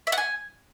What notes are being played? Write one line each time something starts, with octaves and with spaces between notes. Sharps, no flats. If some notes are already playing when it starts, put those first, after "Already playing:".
E5
F#5
G#5